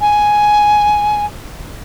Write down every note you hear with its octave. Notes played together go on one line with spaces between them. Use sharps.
G#5